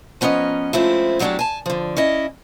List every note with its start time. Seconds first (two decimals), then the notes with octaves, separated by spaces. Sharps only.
0.21 F3 B3 C#4 A#4 D#5
0.73 F3 G#3 A3 C4 C#4 E4
1.19 B2 F#3 A3 D4 G4 G#4
1.39 G#5 A5
1.66 D3 F3
1.97 C#4 E4 D#5